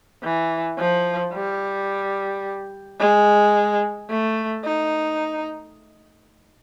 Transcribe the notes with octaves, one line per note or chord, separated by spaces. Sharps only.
E3
F3
G3
G#3
A3
D#4